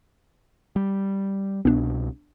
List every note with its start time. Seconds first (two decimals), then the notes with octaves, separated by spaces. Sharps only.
0.76 G3
1.65 C2 B2 B3 D4